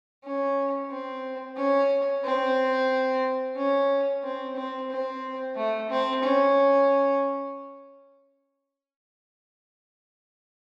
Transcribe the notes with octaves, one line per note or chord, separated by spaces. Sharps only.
C#4
C4
C#4
C4
C#4
C4
C4
C4
A3
C4
C#4